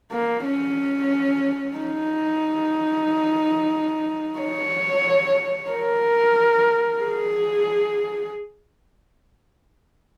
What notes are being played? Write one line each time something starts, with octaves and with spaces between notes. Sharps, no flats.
A#3
C#4
D#4
C#5
A#4
G#4